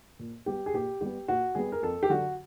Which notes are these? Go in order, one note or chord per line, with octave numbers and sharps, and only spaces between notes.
A#2
G3 B3 G4
G#4
A#2 G4
G3 B3 G4
A#2 F#4
G3 B3 G#4
A#4
F2 A4
G4
D3 F#3 F#4